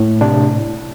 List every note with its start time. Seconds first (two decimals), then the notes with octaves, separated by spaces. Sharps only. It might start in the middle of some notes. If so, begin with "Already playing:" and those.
Already playing: A2
0.21 C3 D4